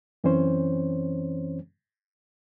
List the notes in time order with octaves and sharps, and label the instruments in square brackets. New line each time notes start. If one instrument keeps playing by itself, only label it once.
[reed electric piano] F#2 E3 C4 C#4 C5 C#5